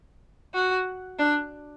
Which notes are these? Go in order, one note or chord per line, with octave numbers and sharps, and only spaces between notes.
F#4
D4